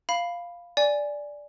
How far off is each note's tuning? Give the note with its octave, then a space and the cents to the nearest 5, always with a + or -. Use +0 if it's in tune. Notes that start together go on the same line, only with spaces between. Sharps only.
F5 +0 B5 +0
D5 -5 G#5 -5